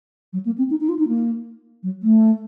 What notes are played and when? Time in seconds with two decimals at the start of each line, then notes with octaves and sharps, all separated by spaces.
0.33 F#3
0.45 A#3
0.58 C4
0.70 D#4
0.80 D#4
0.89 F4
0.99 D#4
1.08 A#3
1.83 F#3
2.03 A3